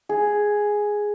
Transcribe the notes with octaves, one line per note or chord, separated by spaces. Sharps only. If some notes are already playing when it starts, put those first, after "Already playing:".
G#4